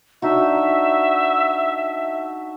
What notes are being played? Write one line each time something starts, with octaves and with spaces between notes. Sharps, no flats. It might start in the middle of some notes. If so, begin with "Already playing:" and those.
D4 D#4 F#4 E5